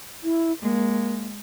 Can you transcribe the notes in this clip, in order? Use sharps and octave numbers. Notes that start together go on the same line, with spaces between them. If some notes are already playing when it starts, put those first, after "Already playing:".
E4
G#3 A#3